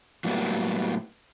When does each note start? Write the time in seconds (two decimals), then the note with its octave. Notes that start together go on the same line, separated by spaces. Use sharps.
0.24 A2 F#3 G3 A#3 B3